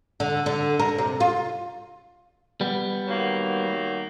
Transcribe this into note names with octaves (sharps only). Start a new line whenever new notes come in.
D3
D3
A#4
C3
F4
G3 B3
D#3 F#3 A#3